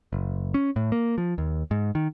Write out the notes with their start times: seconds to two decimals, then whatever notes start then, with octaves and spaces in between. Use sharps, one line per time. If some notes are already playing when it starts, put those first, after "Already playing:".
0.13 F#1
0.54 C#4
0.76 A2
0.92 A#3
1.18 F3
1.38 D#2
1.71 G#2
1.95 D#3